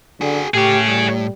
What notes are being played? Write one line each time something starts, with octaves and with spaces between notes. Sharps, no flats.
D3 F#4 G#4
A2 G4 G#4 C#5
G3